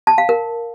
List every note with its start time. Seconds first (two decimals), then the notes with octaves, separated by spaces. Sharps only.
0.07 A5
0.18 F5
0.29 A#4